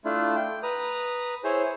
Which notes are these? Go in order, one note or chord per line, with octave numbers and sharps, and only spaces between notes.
A3 D4 E4 F4
G5
B4 A#5 D#6
E4 G#4 C5 C#5